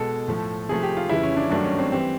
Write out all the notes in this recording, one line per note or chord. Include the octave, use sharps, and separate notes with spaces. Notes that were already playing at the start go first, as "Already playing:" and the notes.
Already playing: B2 G#3 A4
A2 F3 A3
C3 F3 A3 G#4
G4
F4
F2 C#3 E3 G3 E4
C#4
D4
G2 D#3 F#3 A3 D4
C#4
C4
E3 G3 C4